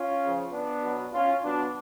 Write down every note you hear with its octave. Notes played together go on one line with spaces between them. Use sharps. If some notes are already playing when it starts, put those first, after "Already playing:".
Already playing: C#4 F4
C#3 F3
B3 D4
B2 F#3
C#4 F4
B2 F#3 B3 D4